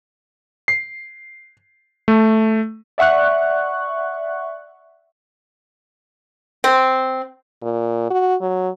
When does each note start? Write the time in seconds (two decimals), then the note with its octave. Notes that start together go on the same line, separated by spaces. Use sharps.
0.68 C7
2.08 A3
2.98 D5 E5 F#5 C#6 F#6
6.64 C4
7.62 A#2
8.10 F#4
8.41 F#3